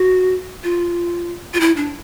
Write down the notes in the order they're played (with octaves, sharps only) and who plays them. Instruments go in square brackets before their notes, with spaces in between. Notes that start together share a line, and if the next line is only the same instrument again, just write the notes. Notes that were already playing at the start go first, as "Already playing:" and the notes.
Already playing: [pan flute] F#4
F4
F4
E4
D4